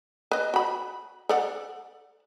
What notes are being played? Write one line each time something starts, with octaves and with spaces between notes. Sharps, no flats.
B4 D#5
F#4 B5
A4 D5 F#5